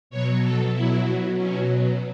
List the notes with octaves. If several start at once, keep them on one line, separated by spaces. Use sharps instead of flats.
B2 F#3 C#5
A4
B2 F#3 E4
B2 F#3 C#4